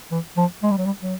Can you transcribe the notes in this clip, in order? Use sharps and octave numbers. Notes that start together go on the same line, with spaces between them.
E3
F3
G#3
G3
F#3
G3
F#3